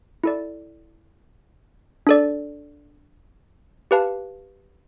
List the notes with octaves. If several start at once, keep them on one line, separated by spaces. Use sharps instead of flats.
E4 A4 D5
D4 A4 D5
G4 B4 F5 A5